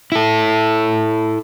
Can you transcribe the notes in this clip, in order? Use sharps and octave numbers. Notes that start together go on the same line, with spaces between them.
E4 A4